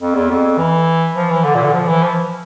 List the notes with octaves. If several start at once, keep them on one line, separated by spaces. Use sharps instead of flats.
F2
E2
F2
E3
F3
E3
D3
A#2
D3
F3
E3
F3